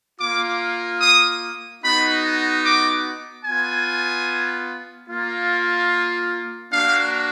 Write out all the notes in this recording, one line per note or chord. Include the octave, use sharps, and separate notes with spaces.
A#3 F4 D6
D#6
B3 D#4 F#4 B5
D6
B3 F4 G#5
A#3 F4
A#3 D4 F#4 F5